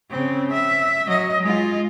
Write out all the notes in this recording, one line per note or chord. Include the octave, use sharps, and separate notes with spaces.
C#3 C4
E5
F#3 D#5
G#3 F4